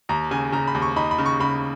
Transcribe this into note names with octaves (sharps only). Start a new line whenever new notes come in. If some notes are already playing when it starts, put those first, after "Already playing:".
D#2 A#5
C#3 G#5
C#3 A#5
B5
D#2
C#6
D#4 B5
B5
C#3
C#6
C#3 B5